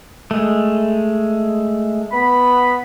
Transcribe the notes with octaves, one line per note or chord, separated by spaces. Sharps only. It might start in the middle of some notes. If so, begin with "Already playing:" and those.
G#3 A3
B3 B5